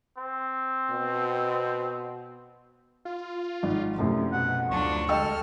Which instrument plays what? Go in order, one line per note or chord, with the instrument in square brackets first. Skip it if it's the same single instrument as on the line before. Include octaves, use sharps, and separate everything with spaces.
[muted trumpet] C4
[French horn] B2
[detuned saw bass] F4
[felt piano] G#1 G#2 [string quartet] F3
[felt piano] F#2 A2 C3
[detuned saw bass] B2 [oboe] F#5
[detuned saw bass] D2 [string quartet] F#3 D4 F4 [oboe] C#6
[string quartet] G#3 A4 F6 [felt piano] D#5 G5 E6